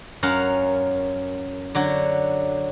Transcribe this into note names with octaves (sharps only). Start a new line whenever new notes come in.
F#2 C#4 A#4 F5 F#5
D3 F#3 F#4